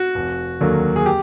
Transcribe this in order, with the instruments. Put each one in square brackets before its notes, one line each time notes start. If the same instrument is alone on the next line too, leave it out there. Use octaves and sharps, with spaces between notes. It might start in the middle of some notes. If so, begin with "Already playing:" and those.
Already playing: [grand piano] F#4
F1
D#2 D3 F#3 A#3
G#4
G4